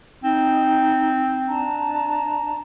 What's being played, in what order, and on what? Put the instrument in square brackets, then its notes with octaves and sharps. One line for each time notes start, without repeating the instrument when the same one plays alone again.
[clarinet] C4 [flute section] D#4
[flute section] D4 A5 A#5